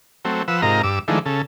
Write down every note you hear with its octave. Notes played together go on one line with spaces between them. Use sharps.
F#3 A3 C4
F3 B4 F#5 E6
G#2 C3 F4 A#4 D#5 A#5
G2 D6 E6
D#3 F3 G#3 A3 D4 E4
C#3 A4